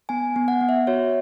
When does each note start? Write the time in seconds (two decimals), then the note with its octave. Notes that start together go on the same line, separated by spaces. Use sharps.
0.09 B3 G#5
0.36 B3
0.48 F#5
0.61 B3
0.69 E5
0.87 F#4 C#5